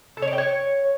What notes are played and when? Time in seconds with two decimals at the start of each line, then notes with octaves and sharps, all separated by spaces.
0.17 A4
0.22 C#5
0.28 D5
0.33 G5
0.38 C#5